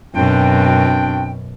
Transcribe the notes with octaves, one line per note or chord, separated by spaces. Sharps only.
F#2 B2 C4 D4 G5